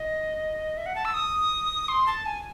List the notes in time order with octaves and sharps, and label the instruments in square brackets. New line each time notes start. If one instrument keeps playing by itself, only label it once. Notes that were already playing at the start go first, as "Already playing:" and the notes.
Already playing: [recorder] D#5
E5
F#5
A5
E6
D#6
C6
A5
G#5